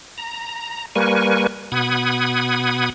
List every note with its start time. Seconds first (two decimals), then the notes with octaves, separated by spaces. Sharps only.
0.18 A#5
0.95 G3 A#3 A#4 B4 G#5 C#6
1.72 B2 F#5 B5 D#6 G#6